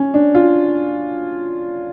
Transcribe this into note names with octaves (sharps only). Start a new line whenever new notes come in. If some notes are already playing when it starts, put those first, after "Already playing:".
Already playing: C#4
D4
F4